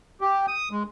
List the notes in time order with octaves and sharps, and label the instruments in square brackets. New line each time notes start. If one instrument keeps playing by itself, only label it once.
[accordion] G4
D#6
G#3